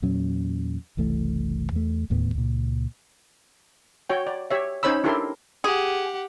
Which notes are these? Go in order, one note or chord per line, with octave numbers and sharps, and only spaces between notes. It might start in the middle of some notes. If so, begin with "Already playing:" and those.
E2 A#2 F#3 C#4
F#1 C2 E3 A3
E2 A3
D1 D#2 A2 B3
C#2 A#2
F#4 C#5 G5
D5
G4 C#5 E5
C#4 D#4 C5 C#5 B5 E6
D4 E4 G4 A4 A#4 C6
G4 G#4 F#5